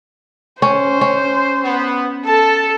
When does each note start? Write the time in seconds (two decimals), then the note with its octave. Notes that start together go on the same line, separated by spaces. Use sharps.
0.62 C#4 C5
1.01 C#4
1.63 B3
2.26 A4 A5